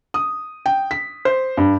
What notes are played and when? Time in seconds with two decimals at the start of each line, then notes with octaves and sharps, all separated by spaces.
0.14 D#6
0.66 G5
0.91 B6
1.25 C5
1.57 G2